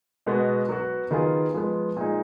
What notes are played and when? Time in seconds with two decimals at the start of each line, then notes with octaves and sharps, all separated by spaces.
0.26 B2 G#3 B3 F#4
0.69 F#3 B3 F#4
1.11 D#3 F#3 B3 F4 G#4
1.54 F3 G#3 B3
1.97 A#2 G#3 D#4 G#4